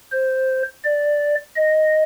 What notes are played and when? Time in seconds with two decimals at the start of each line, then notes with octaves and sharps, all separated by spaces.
0.12 C5
0.84 D5
1.56 D#5